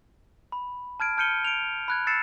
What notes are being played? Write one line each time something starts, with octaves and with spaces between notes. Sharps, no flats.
B5
A5 F6 G#6 D7
A5 F6 G6 C#7 D#7 G7
D7 F7
B5 F#6 G#6
E6 A6 C7 C#7 E7